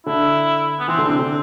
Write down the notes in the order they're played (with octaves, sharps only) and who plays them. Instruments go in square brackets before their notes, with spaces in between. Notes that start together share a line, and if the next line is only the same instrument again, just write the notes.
[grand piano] D3 [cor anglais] E4
[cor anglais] B3
[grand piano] E3 [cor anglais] C4
[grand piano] D3
C3
D3